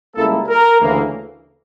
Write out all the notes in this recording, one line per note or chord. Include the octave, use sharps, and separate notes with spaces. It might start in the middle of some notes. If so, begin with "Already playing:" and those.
C#2 C#3 G3 A#3 E4 A4
A#4
D2 C#3 E3 A#3